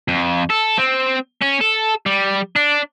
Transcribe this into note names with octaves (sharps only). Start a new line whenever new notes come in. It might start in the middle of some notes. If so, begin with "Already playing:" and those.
F2
A4
C4
C#4
A4
G3
D4